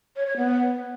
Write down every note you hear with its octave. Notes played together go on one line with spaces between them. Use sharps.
C#5
C#5
B3